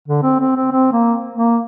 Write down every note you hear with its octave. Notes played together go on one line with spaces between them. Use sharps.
D3
C4
C4
C4
C4
A#3
A#3